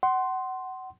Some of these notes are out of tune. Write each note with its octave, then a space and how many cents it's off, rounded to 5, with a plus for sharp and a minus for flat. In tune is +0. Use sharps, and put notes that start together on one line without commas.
F#5 +25 C6 +0